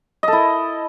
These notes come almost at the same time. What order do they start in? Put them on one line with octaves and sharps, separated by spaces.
D#5 A4 E4